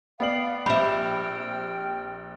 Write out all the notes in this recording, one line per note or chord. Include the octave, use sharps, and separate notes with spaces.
B3 D5 F5 G5 F#7
A#1 C4 G4 E5 G5 B5 F6